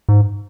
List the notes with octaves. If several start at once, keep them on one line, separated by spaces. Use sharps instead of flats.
G#2